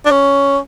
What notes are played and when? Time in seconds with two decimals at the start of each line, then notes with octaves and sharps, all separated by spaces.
0.05 D4
0.11 C#4